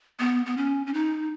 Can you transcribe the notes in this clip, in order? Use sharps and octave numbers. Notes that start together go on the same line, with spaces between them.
B3
B3
C#4
C#4
D#4